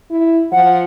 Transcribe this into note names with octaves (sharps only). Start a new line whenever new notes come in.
E4
F3 F#5